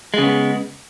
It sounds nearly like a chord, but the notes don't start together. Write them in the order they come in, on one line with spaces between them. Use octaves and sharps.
G#3 C#3 B3